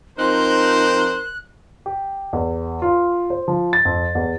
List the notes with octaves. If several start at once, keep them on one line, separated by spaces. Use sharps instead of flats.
F3 C4 D#4 A#4 C5 F#6
G4
E2
F4
C5
F3
A6
F2
E2